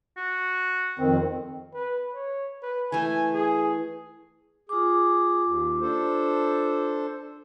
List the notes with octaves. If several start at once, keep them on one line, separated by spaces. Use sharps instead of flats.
F#4
F2 D#3 C4
B4
C#5
B4
E3 A3 G#5
G#4
F4 G#4 D6
D#2
D4 A4 C5